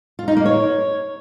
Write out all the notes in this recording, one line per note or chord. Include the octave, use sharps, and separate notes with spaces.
F4
D#4
A#3
C#5